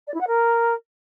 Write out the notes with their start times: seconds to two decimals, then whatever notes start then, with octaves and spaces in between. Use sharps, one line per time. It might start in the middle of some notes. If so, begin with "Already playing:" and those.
0.07 D5
0.14 E4
0.20 F#5
0.27 A#4